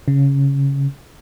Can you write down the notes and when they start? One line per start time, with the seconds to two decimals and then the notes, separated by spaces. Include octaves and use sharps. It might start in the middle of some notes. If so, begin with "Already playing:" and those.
0.08 C#3